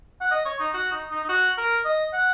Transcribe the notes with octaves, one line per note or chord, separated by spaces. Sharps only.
F#5
D#5
C#5
D#4
F#4
D#4
D#4
D#4
F#4
A#4
D#5
F#5